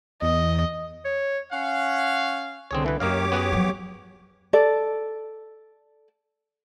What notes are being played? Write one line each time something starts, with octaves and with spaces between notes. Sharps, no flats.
E2 D#5
C#5
C#4 F5 F#5
C2 D3 C4 G#4 C#5
E3 B4
F#2 A#3 G4 C#5 D#5 F5 D6
B3 F#4 G#4
F3 F#3
A4 D5